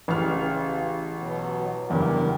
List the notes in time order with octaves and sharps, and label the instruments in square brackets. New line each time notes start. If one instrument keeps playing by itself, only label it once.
[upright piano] A1 F6 [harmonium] C#3
[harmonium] B2 F#3 B3
[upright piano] F#1 E2 G2 [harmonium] E3 G4 A#4